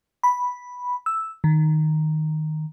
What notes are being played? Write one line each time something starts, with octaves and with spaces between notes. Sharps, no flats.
B5
E6
D#3